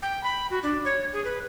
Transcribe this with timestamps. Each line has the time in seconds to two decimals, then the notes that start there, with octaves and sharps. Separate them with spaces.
0.02 G5
0.24 B5
0.50 F#4
0.63 D4
0.85 C#5
1.13 G#4
1.25 B4